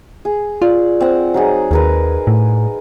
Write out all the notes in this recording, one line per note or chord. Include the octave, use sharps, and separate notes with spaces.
G#4
F4 D5
C4 F#5
F#3 D#4 G#4
D#2 G#4 A#4 B4
A2